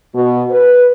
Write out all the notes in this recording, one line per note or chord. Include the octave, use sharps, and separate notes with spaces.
B2
B4